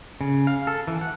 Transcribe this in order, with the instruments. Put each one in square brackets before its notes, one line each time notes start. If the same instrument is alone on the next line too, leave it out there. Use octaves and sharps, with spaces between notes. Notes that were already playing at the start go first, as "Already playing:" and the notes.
[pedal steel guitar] C#3
F5
A4
E3
F#5